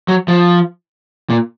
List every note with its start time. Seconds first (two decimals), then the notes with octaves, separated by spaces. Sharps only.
0.08 F#3
0.28 F3
1.30 A#2